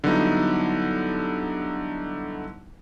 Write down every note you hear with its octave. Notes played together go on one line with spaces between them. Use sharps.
D3 F#3 G3 B3 D#4 E4